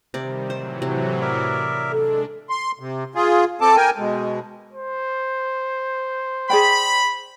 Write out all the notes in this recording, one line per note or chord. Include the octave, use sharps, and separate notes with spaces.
C3 D#3 G3 D5
A2 E3 F#3 C5
C3
A#4 D5 E5
G#3 D4 A4
C6
C3
F4 G#4
C4 A4 A5 D6
A#4 G5 G#5
B2 G#3
C5
G#4 D5 G5 B5